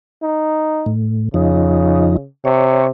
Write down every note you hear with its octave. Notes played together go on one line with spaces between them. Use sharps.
D#4
A2
F2 C#3 F3 D#4
C3 C#5